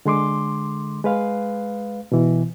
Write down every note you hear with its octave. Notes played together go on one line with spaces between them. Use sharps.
D3 G#3 C6 D6
G#3 B4 F5
B2 E3